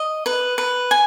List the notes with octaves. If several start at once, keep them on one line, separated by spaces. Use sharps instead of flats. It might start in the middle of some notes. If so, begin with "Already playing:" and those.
Already playing: D#5
B4
B4
G#5